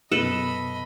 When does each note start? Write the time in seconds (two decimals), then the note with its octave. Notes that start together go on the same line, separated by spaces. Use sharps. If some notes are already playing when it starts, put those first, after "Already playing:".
0.12 F#2 B2 A4 B4 D#5 B5